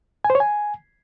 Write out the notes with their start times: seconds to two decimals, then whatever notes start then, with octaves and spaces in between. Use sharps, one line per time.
0.24 G#5
0.30 C5
0.35 C#5
0.40 G#5